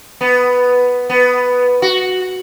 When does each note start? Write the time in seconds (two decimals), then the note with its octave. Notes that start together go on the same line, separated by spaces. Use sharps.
0.21 B3
1.10 B3
1.82 F#4